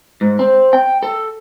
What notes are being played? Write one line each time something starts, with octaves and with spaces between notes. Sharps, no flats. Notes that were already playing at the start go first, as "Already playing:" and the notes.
G#2
C4
G5
A4